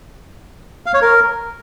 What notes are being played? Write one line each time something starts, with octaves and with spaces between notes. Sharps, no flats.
F5
C#5
A#4